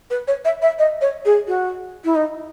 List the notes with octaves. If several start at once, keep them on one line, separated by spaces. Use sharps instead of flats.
B4
C#5
E5
E5
D#5
C#5
G#4
F#4
E4
D#4